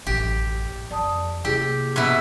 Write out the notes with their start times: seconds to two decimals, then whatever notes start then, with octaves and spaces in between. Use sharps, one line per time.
0.07 A1 F#2 G4
0.91 F2 D5 A5 D#6
1.45 C3 A#3 E4 G4 G#4
1.96 G#2 B2 E4 E6